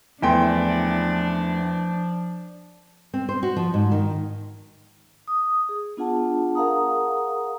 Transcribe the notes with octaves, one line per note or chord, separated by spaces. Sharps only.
E2 F3 A3 D4 E4 G5 C6
C4
C5
F#4
F3
G#2
D#3
D#6
G#4
B3 D4 F4 G#4 F#5 A5
G#4 A#4 F5 F#5 A#5 D#6